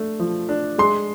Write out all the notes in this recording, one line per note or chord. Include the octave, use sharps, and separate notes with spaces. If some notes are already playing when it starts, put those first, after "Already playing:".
Already playing: A3 D4
F3
D4
G#3 C6